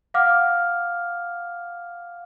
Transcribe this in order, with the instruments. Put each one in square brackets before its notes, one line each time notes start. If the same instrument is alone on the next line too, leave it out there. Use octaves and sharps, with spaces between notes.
[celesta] F5 F#5 D6 F6